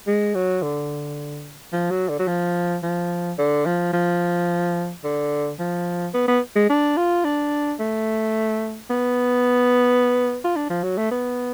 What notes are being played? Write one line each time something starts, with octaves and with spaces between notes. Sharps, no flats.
G#3
F#3
D3
F3
F#3
D3
F#3
F3
F3
D3
F3
F3
D3
F3
B3
B3
G#3
D4
F4
D4
A3
B3
F4
D4
F3
F#3
A3
B3